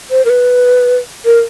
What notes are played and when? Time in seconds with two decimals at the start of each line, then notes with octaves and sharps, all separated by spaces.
0.11 C5
0.25 A#4
0.30 B4
1.25 A#4